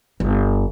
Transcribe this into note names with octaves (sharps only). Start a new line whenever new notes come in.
G1